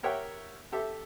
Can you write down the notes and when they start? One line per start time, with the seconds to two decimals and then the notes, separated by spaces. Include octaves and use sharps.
0.03 G4 A#4 C#5 E5 F#5 G5
0.72 G4 A4 E5